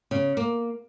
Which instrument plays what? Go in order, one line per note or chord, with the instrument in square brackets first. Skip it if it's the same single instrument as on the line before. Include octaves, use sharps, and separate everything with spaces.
[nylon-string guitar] C#3
A#3